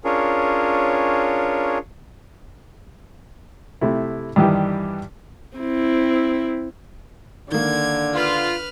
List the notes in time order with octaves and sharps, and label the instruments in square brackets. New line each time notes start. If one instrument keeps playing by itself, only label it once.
[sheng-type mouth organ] C#4 D4 F4 G#4 A#4 C#5
[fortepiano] C3 A3 E4
G2 D#3 E3 G3 G4
[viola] C4 E4
[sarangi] D3 [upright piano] D#3 A#3 [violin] G#6
[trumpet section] F4 [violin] B4 F6